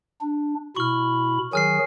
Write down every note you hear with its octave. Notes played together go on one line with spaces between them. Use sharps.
D4
B2 E4 B5 C#6 F6
D#3 F#3 G#4 G#5 F6 C7